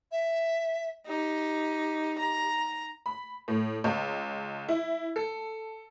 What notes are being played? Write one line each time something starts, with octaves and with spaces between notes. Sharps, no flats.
E5
D#4 G4
A#5
B5
A2
C#2
E4
A4